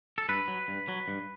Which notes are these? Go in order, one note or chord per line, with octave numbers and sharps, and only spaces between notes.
A4
G2 B4
F#3
G2
F#3
G2